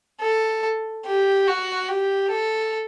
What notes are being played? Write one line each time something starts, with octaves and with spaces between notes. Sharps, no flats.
A4
G4
F#4
G4
A4